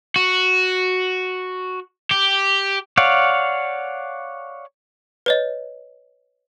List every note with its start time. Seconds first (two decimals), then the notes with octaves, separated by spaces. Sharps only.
0.16 F#4
2.11 G4
2.97 C#5 D5 F5 F#5
5.26 B4 C#5 D#5